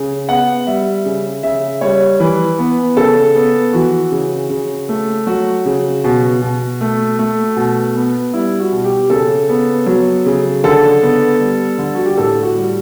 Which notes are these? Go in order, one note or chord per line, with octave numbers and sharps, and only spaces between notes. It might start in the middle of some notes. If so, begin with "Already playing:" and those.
Already playing: C#3
B3 F#5
G3 E5
C#3
C#3 E5
G3 C#5
E3 B4
B3
C#3 A4
B3
E3 F#4
C#3
C#3
A3
F#3 F#4
C#3
B2
B2
A3
A3
B2
B3
G3 E4
F#4
B2
G4
C#3 A4
B3
F#3
C#3
D3 A4
B3
G3
D3
F#4
G4
A2 A4
F#4
G3